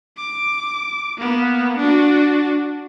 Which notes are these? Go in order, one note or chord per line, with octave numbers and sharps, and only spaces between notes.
D6
A#3 B3
D4 F#4